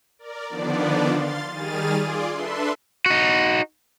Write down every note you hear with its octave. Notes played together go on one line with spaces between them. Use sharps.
A#4 D5
D3 D#3 F3 B3 D4 D5
F5 C6 A6
D#3 G3 G#4 F6 A6 D#7
F4 G#4 D5 C6 D6
D4 A4 B4 E5 C6
D#4 F#4